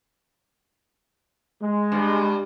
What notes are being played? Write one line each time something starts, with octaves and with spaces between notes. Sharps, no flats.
G#3
G2